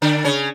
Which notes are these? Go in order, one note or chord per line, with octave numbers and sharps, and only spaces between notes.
D3 D4
C#3 C#4